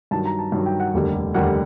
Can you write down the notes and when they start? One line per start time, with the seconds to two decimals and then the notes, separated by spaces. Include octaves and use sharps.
0.11 G2 D#3 F#3 A5
0.25 A#5
0.39 A5
0.52 G2 D#3 F#3
0.66 G5
0.80 F#5
0.94 F1 D#2 D3 G3 A#3
1.34 F1 D#2 D3 G3 A#3 F#5